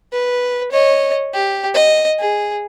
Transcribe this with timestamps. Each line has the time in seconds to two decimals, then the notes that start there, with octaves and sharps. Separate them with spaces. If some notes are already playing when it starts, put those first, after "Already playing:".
0.13 B4
0.72 C#5 D#5
1.34 G4
1.74 D#5
2.19 G#4